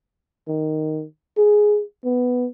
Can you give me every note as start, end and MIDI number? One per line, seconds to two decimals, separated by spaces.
0.48 1.04 51
1.38 1.82 68
2.04 2.48 59